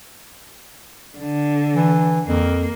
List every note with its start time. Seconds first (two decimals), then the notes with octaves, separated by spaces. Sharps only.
1.18 D3
1.76 E3
2.27 F2 A#3